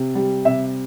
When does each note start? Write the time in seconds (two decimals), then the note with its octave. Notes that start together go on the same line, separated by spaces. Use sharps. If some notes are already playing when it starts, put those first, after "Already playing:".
Already playing: C3
0.15 G3
0.45 C3 E5